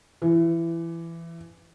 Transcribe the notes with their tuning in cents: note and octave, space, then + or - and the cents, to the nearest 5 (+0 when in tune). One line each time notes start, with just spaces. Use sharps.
E3 +20